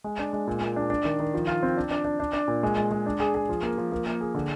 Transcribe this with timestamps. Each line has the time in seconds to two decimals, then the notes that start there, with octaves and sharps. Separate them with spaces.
0.04 G#3
0.19 D4
0.33 G#3
0.47 A#2
0.61 A#2
0.76 D4
0.90 D4
1.05 D#3
1.20 D#3
1.34 F3
1.47 F4
1.63 C4
1.77 D4
1.91 D4
2.05 D4
2.20 D4
2.33 D4
2.48 A#2
2.63 G#3
2.78 G#3
2.91 G#3
3.06 D4
3.20 G#4
3.35 G#4
3.49 F3
3.63 A#3
3.78 F3
3.92 A#3
4.06 A#3
4.21 G#4
4.35 D3